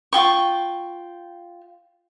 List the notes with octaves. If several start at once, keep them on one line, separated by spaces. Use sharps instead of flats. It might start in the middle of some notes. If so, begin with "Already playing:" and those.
F4 G5 C#6